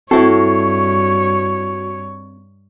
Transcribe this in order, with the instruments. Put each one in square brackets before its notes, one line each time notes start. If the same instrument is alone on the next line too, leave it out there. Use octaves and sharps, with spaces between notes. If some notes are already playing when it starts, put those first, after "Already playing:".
[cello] G2 C#5 [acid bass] C4 [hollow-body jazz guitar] E4 A4 [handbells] F#4